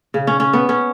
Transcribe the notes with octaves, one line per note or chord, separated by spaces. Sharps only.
C#3
C#4
C#4
B3
C#4